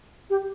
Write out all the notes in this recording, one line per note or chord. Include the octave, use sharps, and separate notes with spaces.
G4